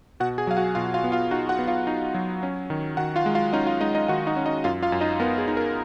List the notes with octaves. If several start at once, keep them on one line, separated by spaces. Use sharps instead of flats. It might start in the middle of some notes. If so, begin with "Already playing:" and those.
B2 F#4 F#5
G#4 G#5
F#3 F5
F#4 F#5
B2 F4 F5
F4 F5
B3
F4 F5
D#4 F#4 F#5
F#4 F#5
B3
F4 F5
D#4
F#3
C#4
D#3
D#3 F#4 F#5
F4 F5
G#3
F4 F5
C#4 D#4 D#5
F4 F5
G#3 D#4 D#5
D#4 D#5
D#3 F#4 F#5
D#4 D#5
C#4
D#4 D#5
F#2 F4 F5
F4 F5
F#2
D#4 D#5
B3 A#4
G#4
D#4
A#4